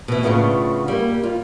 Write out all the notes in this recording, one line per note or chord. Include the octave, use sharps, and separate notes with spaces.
B2 E3
A2 C#3 B3 D4 F4
G3 A#3
F4